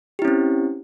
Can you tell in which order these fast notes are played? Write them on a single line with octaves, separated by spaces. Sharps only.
G4 E4 C#4 C4